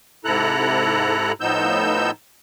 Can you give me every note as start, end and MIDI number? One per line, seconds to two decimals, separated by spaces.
0.25 1.32 44
0.25 1.32 48
0.25 1.32 64
0.25 1.32 69
0.25 1.32 82
0.25 1.32 90
1.41 2.11 45
1.41 2.11 53
1.41 2.11 59
1.41 2.11 63
1.41 2.11 88
1.41 2.11 91